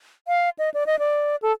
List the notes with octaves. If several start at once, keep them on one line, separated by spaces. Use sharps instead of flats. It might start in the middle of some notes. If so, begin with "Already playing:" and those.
F5
D#5
D5
D#5
D5
A4